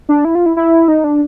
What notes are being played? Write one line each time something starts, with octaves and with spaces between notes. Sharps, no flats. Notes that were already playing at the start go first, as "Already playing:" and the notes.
D4
E4
F4
E4
E4
D#4
D4